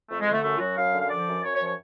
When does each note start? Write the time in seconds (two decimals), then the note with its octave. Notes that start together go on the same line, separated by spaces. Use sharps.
0.09 F2 A3
0.21 G#3
0.26 D3
0.32 A3
0.43 F#2 A3
0.55 F4
0.60 F#3 F#4
0.76 F#2 F5
0.93 D3
1.01 F5
1.10 F3 D5
1.27 F#2
1.43 F#2 C#5
1.54 C#5
1.60 F3
1.66 C#5